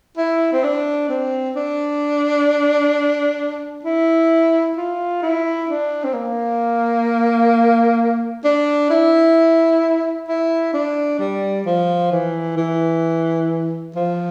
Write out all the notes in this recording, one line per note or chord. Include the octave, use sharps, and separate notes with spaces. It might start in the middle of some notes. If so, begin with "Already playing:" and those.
E4
C4
D4
C4
D4
E4
F4
E4
D4
C4
A#3
D4
E4
E4
D4
G3
F3
E3
E3
F3